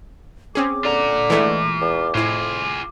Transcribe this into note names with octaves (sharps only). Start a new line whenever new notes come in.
C4 C#4 G#4 D6
D3 F4 A#5
E3 G#3 A3
E2
F2 A2 E4 F4 G#4